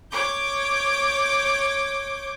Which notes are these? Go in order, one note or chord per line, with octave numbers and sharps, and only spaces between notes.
C#5 D6 G6